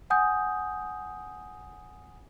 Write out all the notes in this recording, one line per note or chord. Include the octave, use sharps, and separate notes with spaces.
F#5 G#5 D#6 G6